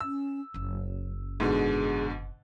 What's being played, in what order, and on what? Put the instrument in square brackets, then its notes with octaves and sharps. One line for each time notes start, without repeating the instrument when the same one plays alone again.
[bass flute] C#4 [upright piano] E6
[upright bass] F#1 C#4 [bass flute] F#3
[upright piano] G#2 B2 D3 [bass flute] G#4